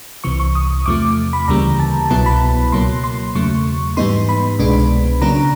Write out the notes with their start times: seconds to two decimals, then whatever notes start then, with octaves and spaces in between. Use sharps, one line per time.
0.24 C2 C3 E3 C#6
0.40 C#6
0.55 D#6
0.86 E2 C3 F3 A3 D6
1.33 B5
1.48 D2 C#3 E3 G3 A#3 A#5
1.80 A5
2.10 C2 B2 F#3 B3 E4 A5
2.26 B5
2.72 C#2 B2 F#3 A#3 C6
3.04 C6
3.35 E2 C#3 F#3 A3 C#6
3.97 G#2 E3 G3 B3 D#4 C6
4.29 B5
4.59 C2 B2 G#3 B3 D4
5.22 C#3 F#3 A#3 D4 A#5